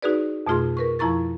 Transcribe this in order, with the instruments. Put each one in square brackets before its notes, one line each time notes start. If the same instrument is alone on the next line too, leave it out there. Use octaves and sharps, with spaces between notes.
[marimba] D#4 F#4 G#4 B4 D5
F2 B2 A3 F4 G#4 C6
A#4 B4 C#6
F2 F3 E4 A#5 C#6 A6